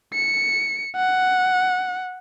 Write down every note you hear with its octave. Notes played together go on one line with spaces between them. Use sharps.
C#7
F#5